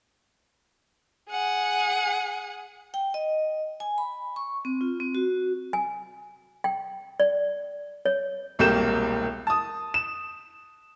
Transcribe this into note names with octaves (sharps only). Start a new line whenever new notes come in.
G#4 F#5
G5
D#5
G#5
B5
C#6
C4
F4
C4
F#4
G#5
G5
D5
C#5
E1 C2 A#3 G4 G6 E7
A5 D#6
E7